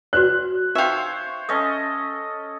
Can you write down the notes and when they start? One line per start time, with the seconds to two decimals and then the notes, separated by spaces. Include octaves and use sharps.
0.13 F#4 B4 D5 F#6
0.75 D#4 C5 C#5 E5 F5 G5
1.49 C#4 A4 D#5 D#6